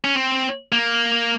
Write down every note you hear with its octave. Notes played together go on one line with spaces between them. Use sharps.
C#4
C4
A#3